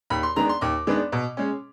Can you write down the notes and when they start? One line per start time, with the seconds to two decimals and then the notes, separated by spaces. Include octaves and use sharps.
0.10 D#2 B5
0.23 C6
0.36 D#3 G#3 B3 D4 A#5
0.49 C6
0.61 D#2 D6
0.87 D#3 G#3 B3 D4
1.12 B2
1.37 G#3 C#4